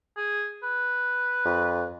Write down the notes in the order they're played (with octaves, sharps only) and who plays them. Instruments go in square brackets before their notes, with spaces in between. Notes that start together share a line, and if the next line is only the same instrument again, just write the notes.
[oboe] G#4
B4
[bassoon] F2